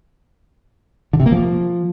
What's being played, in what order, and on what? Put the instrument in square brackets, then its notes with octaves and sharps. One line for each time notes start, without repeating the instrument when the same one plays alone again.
[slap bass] D3
C3
A#3
F3